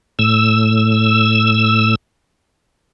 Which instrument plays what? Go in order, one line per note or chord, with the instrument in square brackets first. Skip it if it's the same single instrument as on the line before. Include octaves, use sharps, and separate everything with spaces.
[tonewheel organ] A2 E6